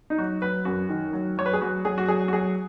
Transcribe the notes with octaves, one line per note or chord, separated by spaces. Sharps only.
D#4
F#3 F#4
F#3 B4
F#2 F#4
D#3
F#3
F#3 C#5
B4
G#4
F#3 F#4
F#3 G#4
F#4
F#3 G#4
F#4
F#3 G#4